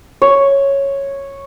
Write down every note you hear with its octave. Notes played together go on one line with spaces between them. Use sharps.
C#5